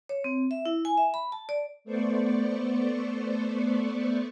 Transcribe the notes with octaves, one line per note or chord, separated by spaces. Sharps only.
C#5
C4
E5
E4
G#5
E5
B5
A5
D5
A3 B3 C5 D5 C#6